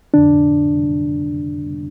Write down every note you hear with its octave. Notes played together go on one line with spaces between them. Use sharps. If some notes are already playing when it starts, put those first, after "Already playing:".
F2 D3 D4